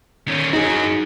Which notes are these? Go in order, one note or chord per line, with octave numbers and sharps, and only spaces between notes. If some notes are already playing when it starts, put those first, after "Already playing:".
D#3 C#4
F#2 D#4 F#4 G#4